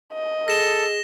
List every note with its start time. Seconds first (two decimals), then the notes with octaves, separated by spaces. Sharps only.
0.13 D#5
0.48 G#4 A4 A#6 E7 G7